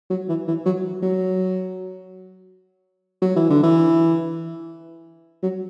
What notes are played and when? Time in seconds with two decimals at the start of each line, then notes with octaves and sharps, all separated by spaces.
0.10 F#3
0.29 E3
0.48 E3
0.66 F#3
1.02 F#3
3.22 F#3
3.36 E3
3.50 D3
3.63 E3
5.43 F#3